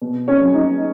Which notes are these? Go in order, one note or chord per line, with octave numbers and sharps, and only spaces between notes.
B2
C#4 C#5
F#3
D#4 D#5